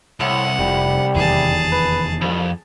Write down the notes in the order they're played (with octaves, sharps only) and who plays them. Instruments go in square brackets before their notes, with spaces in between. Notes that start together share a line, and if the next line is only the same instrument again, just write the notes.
[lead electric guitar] C2 [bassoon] A2 [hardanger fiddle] F#5
[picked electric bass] F1 [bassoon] G3
[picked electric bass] F1 E2 D#3 [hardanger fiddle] G#4 A5
[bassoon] B4
[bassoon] C2 [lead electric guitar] F2